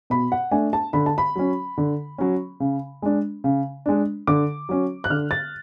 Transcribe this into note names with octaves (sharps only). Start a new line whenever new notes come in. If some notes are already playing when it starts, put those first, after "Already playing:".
B2 B5
F#5
A3 D4 G#5
A5
D3 B5
A5
B5
F#3 C#4
D3
F#3 C#4
C#3
G#3 D4
C#3
G#3 D4
D3 D6
F#3 C#4
F#6
D3 F6
A6